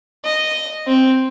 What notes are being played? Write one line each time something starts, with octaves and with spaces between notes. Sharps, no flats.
D#5
C4